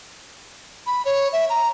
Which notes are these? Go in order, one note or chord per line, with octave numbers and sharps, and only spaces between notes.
B5
C#5
E5
A#5